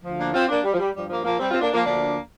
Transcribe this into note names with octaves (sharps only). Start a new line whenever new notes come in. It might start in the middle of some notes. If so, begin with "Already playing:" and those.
D2 D3 F3
A#3 D4
C4 F4
A#3 D4
G3
F3
G3
G2 F3 G3
F3 A#3
F3 A#3
G3 C4
C4 F4
A#3 D4
F3 A#3
D2 D3 F3 A#3 D4